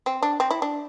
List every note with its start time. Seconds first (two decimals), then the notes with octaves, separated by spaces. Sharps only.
0.06 C4
0.22 D4
0.40 C4
0.51 E4
0.62 D4